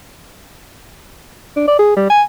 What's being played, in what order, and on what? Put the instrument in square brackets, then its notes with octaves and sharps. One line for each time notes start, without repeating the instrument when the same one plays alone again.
[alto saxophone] D4
D5
G#4
G3
G#5